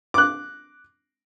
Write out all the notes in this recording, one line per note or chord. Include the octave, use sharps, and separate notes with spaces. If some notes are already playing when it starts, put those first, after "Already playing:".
D6 F#6